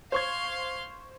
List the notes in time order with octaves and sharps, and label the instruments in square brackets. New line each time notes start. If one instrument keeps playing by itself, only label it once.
[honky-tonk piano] C5 C#6 G#6 [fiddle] F5 C6